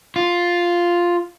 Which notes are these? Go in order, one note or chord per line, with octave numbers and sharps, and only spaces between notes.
F4